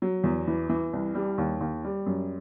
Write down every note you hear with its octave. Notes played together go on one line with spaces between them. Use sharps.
F#3
E2
E3
E3
C2
G3
D#2
D#2
G3
F#2